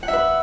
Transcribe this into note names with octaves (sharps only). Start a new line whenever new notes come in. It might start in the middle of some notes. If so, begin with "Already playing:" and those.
F#5
E5
B4